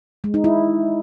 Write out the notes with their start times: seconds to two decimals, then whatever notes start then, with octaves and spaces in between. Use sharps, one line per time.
0.24 G#3
0.34 D#4
0.44 E4